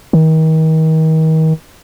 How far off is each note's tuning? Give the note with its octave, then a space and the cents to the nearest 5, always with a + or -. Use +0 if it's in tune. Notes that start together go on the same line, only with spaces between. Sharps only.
D#3 +35